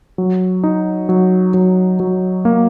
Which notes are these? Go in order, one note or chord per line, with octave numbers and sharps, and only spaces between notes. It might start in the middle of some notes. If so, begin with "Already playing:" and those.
F#3
D#4
F#3
F#3
F#3
A#3